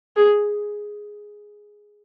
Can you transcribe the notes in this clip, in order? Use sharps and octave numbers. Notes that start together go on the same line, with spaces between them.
G#4